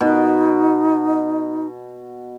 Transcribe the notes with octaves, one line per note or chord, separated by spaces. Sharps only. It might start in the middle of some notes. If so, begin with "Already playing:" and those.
B2 D#4